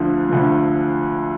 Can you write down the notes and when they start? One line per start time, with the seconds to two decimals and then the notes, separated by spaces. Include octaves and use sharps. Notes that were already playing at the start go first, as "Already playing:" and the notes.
Already playing: D2 D3 F3
0.29 D2 D3 F3